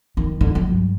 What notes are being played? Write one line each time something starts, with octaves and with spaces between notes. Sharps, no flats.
D#3
D3
F#3
G2